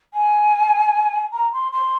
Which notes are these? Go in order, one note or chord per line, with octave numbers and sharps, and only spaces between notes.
G#5
A#5
C6
C6